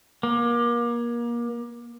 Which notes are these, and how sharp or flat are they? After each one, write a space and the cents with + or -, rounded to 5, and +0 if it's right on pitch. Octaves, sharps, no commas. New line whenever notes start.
A#3 +30